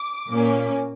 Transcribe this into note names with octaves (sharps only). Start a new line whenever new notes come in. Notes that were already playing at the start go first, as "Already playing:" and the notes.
Already playing: D6
A#2 A#3 C#4